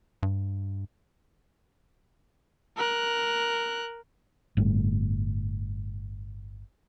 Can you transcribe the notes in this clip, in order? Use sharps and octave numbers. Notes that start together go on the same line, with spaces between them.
G2
A#4 F#6
G1 A2